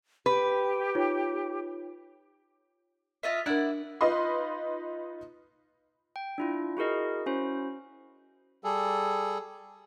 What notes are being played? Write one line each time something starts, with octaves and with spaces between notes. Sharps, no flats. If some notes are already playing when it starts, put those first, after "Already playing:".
G4 B4
D#4 F4 C#5
F4 D#5 E5
D4 E4 A#4 D5 F#5
D#4 F4 B4 D#5 B5 C6
G5
D4 E4 F4
E4 F#4 G#4 A#4 D#5
C#4 E4 F#4 C5
G3 G#4 A4